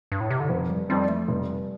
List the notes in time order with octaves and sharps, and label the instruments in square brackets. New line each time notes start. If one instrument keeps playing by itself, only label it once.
[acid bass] G2
A2
C3
D3
[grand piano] F1 [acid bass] F3
[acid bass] G3
[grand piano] F2 F3 C4 [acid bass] G3
[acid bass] A3
[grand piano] F1 [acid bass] G3